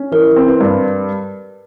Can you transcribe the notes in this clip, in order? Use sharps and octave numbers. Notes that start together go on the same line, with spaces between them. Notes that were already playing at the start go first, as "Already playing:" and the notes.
Already playing: C#4
E3 A#4
C4
B4
G2